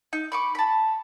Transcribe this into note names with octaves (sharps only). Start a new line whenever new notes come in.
D#4
B5 C#6 D6
A5 B5